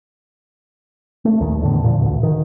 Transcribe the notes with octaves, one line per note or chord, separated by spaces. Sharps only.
A3
A#1 D#2 D#3
E2 A2 D3
A#2 F3
A1 D2
D#3